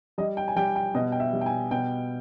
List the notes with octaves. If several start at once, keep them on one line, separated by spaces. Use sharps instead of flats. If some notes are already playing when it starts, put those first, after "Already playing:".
G3 D#5
G5
G#5
G3 G5
G5
B2 D#5
G5
E5
G3
G5
G#5
B2 G5